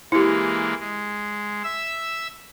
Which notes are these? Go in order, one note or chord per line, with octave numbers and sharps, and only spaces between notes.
E3 G#3 A#3 E4 G4
G#3
E5 E6